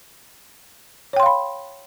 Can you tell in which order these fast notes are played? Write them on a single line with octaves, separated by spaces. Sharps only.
C#5 G5 C6 F5 B5